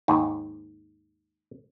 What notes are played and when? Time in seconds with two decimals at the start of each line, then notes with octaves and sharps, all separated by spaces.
0.08 D#2 G#2